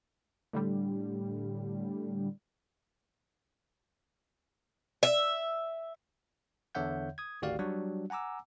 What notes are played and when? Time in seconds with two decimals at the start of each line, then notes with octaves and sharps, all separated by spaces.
0.53 A2 D3 G3
5.03 E5
6.75 E2 D3 C#5 E5 F#5 G6
7.18 D#6 G#6
7.42 G#1 D2 F#4 G4 D5 F5
7.59 F#3 G3 D4 F#4
8.10 F#5 G#5 A#5 D6 E6